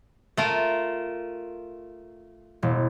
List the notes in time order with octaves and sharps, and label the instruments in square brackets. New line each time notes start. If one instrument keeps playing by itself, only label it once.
[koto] A3 F4 A#4
[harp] E1